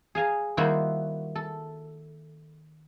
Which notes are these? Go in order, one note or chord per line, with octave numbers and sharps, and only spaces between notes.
G#4 F5 G#5 A#5
D#3 G3 A#3 E4 F#4 C5
A4